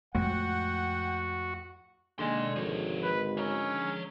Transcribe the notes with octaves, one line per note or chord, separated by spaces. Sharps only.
F2 A2 G#3 F#4 F#5 G5
D3 D#3 G#3 A#3 D5 C6
G#1 F3 C#5
B4
C#4 C#5 A#5